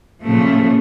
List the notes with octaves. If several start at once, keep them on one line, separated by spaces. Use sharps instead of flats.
A#2 C#3 F3 A3